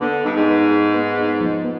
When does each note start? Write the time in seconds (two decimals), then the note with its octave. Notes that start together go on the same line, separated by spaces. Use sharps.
0.01 D3 B3
0.24 G2 D#4
0.36 G#2
0.48 B4
0.71 G#4
0.94 B3
1.18 D#4
1.40 F3
1.64 B3